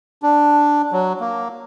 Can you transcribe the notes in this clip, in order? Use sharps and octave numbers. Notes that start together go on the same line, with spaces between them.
D4
F#3
A#3